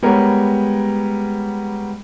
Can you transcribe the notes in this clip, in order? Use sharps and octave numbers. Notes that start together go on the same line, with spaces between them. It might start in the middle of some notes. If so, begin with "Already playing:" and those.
G3 G#3 B3 A#4 C#5